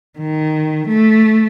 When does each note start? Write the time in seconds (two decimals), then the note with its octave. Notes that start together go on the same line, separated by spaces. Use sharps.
0.19 D#3
0.88 A3